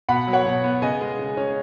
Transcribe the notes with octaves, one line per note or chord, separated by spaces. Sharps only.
B2 F#5 B5
F#3
C#5 F#5
B2
B3
C#3 D#5 G#5
G#3
C#3
C#4